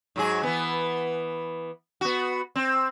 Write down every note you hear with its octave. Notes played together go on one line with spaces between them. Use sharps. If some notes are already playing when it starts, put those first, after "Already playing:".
G#2 F#3 G#4
E3 B3
B3 F#4
C4